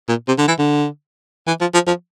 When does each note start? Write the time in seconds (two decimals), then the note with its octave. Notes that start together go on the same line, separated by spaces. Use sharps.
0.08 A#2
0.28 C3
0.38 D3
0.48 E3
0.59 D3
1.47 E3
1.61 F3
1.74 F3
1.87 F3